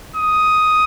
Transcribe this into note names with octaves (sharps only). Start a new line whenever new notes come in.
D#6